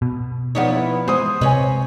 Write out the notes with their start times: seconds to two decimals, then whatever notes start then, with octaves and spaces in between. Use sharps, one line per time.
0.02 B2
0.55 F3 B3 D#4 C#5 D5 F#5
0.72 E4 B4
1.08 G#3 C5 D#6
1.41 C3 B4 C#5 D#5 G#5